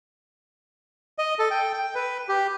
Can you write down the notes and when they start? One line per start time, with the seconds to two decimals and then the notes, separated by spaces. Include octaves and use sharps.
1.18 D#5
1.39 A4
1.51 G5
1.74 G5
1.95 B4
2.28 G4